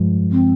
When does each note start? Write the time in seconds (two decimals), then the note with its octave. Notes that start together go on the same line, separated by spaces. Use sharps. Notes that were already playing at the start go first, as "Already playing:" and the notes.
Already playing: G2 F3 G#3
0.32 C4